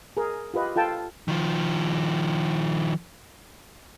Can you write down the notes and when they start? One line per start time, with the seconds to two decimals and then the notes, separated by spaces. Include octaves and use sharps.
0.17 G#4 A#4
0.54 F4 G4 B4 D#5
0.76 F4 A4 G5 A5
1.28 D#3 F3